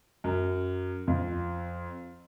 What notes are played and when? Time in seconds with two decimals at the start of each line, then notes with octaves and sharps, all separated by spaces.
0.24 F#2
1.07 F2